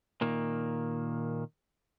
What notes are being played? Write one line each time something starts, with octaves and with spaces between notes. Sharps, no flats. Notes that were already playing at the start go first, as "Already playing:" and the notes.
A#2 D#3 A#3